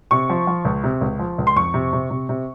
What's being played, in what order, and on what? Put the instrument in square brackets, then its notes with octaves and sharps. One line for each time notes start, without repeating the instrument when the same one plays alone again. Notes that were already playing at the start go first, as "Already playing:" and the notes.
[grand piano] C3 C#6
F3
F3
C#2
C3
C#2
F3
C#2
C6
F2 C#6
C3
C3
C3
C3